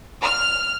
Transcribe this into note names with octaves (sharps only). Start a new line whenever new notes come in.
F6